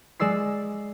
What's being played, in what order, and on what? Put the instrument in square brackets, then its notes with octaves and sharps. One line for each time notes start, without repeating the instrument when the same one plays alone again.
[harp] G#3 D5 E6 C7